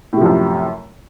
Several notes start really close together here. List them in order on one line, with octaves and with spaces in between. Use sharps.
A2 C3 F3 F#2